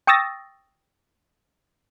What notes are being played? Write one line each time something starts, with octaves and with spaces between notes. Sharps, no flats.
G5 C#6 D#6 E6 A6 A#6